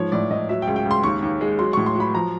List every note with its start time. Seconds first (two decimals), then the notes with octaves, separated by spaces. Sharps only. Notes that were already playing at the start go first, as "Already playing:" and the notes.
Already playing: G#2 F3 C#5
0.12 A2 D5
0.30 A2 D#5
0.49 F#3 E5
0.62 G5
0.67 C#2
0.76 G5
0.86 C#2
0.91 C6
1.04 D#2 C#6
1.22 D#2
1.41 G#3
1.59 F#3 C6
1.73 A2 C#6
1.86 C6
1.95 F#3 B5
2.14 F3 A#5